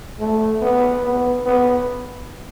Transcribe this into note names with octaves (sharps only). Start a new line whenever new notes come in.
A3
B3
B3
B3